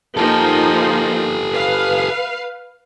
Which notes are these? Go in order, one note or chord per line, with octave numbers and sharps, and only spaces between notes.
F3 A#3 D#4 G4 A4
B4 F5